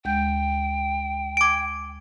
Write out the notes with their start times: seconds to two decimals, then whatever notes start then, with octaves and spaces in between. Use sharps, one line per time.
0.05 D2 G#3 G5 G6
1.37 G#5 D6 G#6 D7